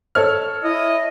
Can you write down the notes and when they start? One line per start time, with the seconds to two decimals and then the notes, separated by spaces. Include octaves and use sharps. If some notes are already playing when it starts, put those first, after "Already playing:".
0.15 A4 C#5 F6
0.63 E4 D#5